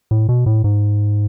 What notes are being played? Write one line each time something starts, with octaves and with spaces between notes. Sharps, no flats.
A2
B2
A2
G#2